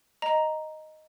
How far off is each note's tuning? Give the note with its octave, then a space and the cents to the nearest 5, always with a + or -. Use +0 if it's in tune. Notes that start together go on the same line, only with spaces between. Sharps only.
D#5 +0 A#5 +0